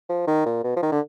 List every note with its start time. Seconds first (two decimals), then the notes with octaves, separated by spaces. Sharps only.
0.09 F3
0.27 D#3
0.46 A#2
0.64 B2
0.76 F3
0.82 D#3
0.92 D3